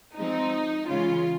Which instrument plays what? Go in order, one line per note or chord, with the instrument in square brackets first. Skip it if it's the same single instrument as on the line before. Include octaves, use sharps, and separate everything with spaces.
[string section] F3 G#3 C4 D#4
C#3 E3 G#3 C#4 F4